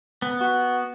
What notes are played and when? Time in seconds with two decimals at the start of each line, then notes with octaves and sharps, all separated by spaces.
0.22 B3
0.41 F#4